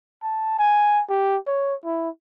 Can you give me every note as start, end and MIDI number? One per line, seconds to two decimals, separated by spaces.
0.23 0.54 81
0.59 1.02 80
1.10 1.38 67
1.47 1.75 73
1.85 2.09 64